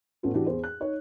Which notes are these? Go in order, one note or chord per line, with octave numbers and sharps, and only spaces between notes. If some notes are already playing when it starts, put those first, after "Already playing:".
A1 A3 B3 C#4 F4
E3 D4 F#4 G4
E2 C5
F#6
D#4 C#5